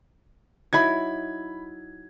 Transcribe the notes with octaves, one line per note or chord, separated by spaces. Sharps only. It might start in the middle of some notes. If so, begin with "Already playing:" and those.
F#3 D#4 E4 B5 G#6